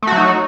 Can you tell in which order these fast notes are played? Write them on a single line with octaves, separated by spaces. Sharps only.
A3 F#4 F#3 D#4